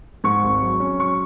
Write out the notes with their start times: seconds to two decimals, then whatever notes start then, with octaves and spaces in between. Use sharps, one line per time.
0.24 G#2 C#6
0.42 G#1
0.61 F#3
0.80 C#4
0.99 F#3 C#6